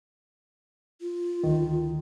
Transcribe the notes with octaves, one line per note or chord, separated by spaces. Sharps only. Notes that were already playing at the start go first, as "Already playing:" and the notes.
F4
D2 D#3